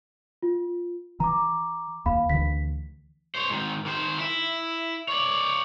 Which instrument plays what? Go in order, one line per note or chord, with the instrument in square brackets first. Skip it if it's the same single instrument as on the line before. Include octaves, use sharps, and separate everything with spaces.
[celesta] F4
[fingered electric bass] E3 [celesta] A#5 D6
[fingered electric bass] D#2 [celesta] F5 B5
[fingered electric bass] D2 E3 [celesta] B6
[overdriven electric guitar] C5 C#5
G#2 D#3
D#3 C5
E4
C#5 D5